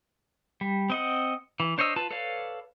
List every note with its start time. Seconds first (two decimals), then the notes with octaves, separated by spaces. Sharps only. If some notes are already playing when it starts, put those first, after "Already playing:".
0.61 G3
0.90 C4 D#5 F#5
1.60 E3
1.78 D4 C5 C#5 D#5 E6
1.96 F4 B4 A5
2.11 A4 B4 C#5 D5 F5